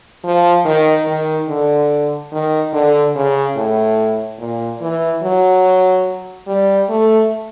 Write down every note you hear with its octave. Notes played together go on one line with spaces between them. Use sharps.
F3
D#3
D#3
D3
D#3
D3
C#3
A2
A#2
E3
F#3
G3
A3